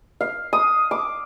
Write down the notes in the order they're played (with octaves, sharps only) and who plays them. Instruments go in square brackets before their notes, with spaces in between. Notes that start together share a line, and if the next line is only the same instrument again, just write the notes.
[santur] F5
D#6
D6